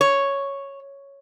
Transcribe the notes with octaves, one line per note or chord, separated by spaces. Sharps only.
C#5